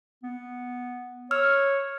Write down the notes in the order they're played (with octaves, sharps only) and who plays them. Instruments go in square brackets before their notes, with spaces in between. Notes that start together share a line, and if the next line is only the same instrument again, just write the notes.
[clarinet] B3
[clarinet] C#5 [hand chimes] E6 F6